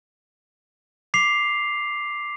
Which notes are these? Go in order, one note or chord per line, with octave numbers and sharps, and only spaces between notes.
D6 B6 C7 F7